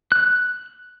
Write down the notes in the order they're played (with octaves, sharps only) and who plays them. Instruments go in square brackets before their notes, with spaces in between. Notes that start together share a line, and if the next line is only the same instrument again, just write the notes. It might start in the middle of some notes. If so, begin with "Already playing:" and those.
[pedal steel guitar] F#6